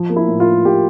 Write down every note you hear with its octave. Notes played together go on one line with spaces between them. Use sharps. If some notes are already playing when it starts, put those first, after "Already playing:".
Already playing: F3
A#3
E4
A2
F4
A#3
A#3 G4